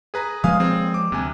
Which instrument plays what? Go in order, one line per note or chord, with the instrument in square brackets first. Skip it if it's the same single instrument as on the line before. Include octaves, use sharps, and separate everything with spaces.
[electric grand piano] G#4 B4 A#5
[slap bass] F3 G#3 A#3 [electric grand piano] F5 G#5 D#6
[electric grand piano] C4 G#4
D6
[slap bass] D2 [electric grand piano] C3 G#5